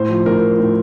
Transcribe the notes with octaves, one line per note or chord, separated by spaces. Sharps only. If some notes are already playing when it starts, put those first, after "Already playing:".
Already playing: A2 C5
F3
A2 A#4
F3
A2